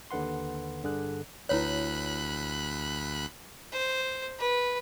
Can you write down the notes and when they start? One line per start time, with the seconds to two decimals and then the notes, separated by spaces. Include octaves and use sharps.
0.11 D#2 D3 B4 F#5 C6
0.83 G2 D3 G#4 F#6
1.49 D2 E4 B4 C#5 B5 F#6
3.73 C5
4.39 B4